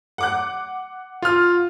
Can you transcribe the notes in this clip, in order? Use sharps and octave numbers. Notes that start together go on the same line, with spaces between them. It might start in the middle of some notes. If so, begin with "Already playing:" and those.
F#5 D6 F#6
F4 F6